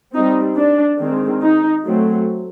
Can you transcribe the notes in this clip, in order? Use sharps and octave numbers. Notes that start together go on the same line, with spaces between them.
G3 C4 D#4
D4
D#3 G#3 C4
D#4
F#3 A3 C4